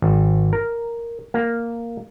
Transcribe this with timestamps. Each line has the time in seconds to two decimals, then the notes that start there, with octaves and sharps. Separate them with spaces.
0.02 G#1
0.53 A#4
1.34 A#3